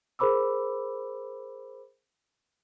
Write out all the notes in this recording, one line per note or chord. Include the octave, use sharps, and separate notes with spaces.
G#4 A#4 C5 B5 D6 E6